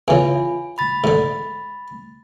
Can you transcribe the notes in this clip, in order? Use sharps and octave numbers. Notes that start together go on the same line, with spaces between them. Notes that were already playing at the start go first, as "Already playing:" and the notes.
E2 C#3 F4 G#5
B5 A6
G#2 D3